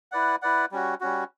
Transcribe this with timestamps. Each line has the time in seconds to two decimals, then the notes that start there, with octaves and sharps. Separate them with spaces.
0.12 E4 B4 D5 F#5
0.42 E4 B4 D5 F#5
0.72 G3 C#4 F#4
1.01 G3 C#4 F#4